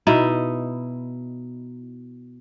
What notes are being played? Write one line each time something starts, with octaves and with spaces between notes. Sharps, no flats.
B2 D#4 E4